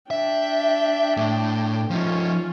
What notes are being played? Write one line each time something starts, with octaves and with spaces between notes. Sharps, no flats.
D4 E5 G5
A2
F3 C#4 D#4 F4